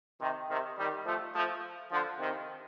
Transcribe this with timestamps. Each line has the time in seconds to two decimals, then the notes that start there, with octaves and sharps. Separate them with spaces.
0.21 C3 D#3
0.49 C3 D#3
0.78 D#3 G3
1.06 F3 A3
1.35 F3 A3
1.92 D3 F3
2.19 C3 D#3